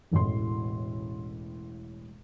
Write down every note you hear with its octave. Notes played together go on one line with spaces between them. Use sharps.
E1 A1 A2 C6